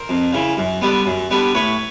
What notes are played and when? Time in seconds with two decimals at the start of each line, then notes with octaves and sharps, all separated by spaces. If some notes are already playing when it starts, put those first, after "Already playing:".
Already playing: A#4 C5
0.09 F2
0.33 C#3 E3
0.57 F#2
0.81 D3 G3 B3
1.06 F#2
1.31 D3 G3 B3
1.55 A2 B4 C#5